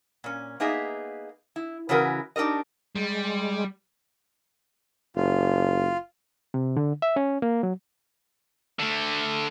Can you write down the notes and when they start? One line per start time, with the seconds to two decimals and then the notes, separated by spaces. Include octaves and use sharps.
0.24 A#2 C#4
0.60 A#3 B3 D#4 G#4 E5
1.56 E4
1.89 C#3 E3 C#4 F#4 A#4 B4
2.36 D4 D#4 G4 A#4 D#5
2.95 G3 G#3
5.16 F#1 F4
6.54 C3
6.77 D3
7.02 E5
7.16 C#4
7.42 A#3
7.63 F#3
8.79 D3 A3